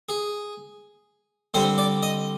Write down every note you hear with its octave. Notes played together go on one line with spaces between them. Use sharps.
G#4
D3 G3 C4 C5
D5
D#5